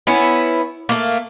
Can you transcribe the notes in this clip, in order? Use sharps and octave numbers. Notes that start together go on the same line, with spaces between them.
B3 C#4 E4
A3 A#3